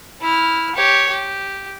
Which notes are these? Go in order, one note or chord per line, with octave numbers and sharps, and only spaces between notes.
E4 F6
G4 C#5
G4